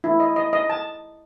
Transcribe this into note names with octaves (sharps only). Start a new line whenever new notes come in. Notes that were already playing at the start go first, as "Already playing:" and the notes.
E4
D#5
D#5
D#5
A5